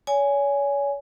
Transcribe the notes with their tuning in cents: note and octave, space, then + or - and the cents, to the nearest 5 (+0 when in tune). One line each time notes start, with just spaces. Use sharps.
C#5 +35 G#5 +0